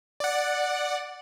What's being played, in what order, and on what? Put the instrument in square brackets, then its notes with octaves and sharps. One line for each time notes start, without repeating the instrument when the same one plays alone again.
[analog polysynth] D5 F#5